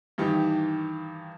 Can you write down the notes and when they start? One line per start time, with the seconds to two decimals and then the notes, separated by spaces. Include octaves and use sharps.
0.18 G2 D#3 E3 D#4 G4